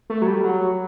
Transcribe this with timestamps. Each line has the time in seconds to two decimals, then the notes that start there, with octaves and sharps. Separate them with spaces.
0.10 A3
0.22 F#3
0.27 G3
0.44 F#3